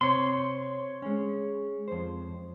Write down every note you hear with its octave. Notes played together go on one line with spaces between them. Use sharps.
C3 C4 C#5 C6
G#3 C#4
F2 C5